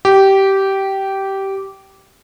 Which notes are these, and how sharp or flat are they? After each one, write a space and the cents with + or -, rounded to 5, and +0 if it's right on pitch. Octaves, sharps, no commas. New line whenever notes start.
G4 -15